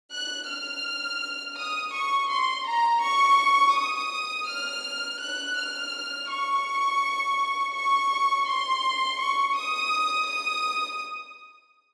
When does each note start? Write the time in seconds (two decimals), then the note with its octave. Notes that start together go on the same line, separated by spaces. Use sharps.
0.12 F#6
0.48 F6
1.57 D#6
1.94 C#6
2.30 C6
2.67 A#5
3.03 C#6
3.75 D#6
4.48 F6
5.20 F#6
5.57 F6
6.29 C#6
7.75 C#6
8.48 C6
9.21 C#6
9.56 D#6
10.30 D#6